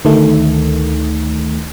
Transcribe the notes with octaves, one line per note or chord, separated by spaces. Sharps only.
D2 D#3 A3